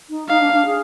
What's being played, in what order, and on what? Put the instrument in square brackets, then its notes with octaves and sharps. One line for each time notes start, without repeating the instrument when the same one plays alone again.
[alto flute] D#4
[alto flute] D#4 [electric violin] F5
[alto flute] D4
D4
G#4